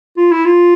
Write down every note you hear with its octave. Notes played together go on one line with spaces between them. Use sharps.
F4
E4
F4